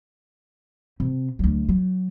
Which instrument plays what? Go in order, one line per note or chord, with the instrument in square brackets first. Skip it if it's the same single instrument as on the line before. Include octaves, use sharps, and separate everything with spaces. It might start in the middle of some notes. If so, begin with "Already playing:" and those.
[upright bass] C3
D2 F#3
F#3